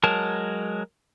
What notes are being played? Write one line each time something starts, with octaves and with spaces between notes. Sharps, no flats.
F#3 G#3 A#4 A5